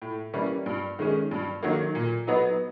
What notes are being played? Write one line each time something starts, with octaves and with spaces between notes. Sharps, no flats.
A2
E3 G3 A#3 C#4
G2
D#3 G#3 C#4
G2
D#3 F#3 A#3
A#2
F#3 B3 D#4